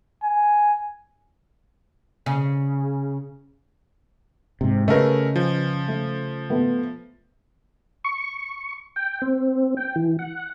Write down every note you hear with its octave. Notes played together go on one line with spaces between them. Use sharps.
G#5
C#3
G#2 C3
C#3 A3 A#4 B4 D#5
F3
A3
A3 B3 A4
C#6
G5
C4
G5
E3
F#5